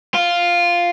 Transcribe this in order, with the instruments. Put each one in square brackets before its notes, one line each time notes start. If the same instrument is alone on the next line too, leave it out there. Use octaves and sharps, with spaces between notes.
[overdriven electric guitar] F4